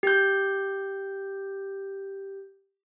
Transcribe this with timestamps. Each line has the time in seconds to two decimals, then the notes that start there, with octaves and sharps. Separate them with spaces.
0.03 G4 G6